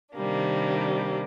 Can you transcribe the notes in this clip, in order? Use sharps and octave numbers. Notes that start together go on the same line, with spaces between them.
C3 D#3 G3 A#3 D4